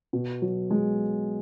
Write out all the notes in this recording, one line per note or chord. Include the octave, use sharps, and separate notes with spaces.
B2
F#3
G#3